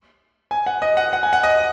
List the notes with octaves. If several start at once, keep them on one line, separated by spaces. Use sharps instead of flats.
G#5
F#5
D#5
F#5
F#5
G#5
F#5
D#5